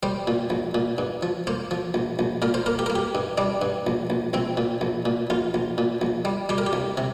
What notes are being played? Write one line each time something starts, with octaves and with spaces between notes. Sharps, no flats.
G3 C5
A#2
A#1
A#2
G2
F3
A#3 C5
F3
A#1
A#1
A#2 A#4
C5
A#3 A#4
G4
A#4
A#3
G4
G2
G3 D4
G2
A#1
A#1
A#1 C4
A#2
A#1
A#2
A#1 F4
A#1
A#2
A#1
G3
G3 G4
A#4
G4
C2
C3